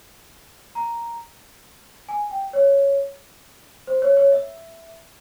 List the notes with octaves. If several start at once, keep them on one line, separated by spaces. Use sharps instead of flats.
A#5
G#5
G5
C#5
C5
C#5
C#5
E5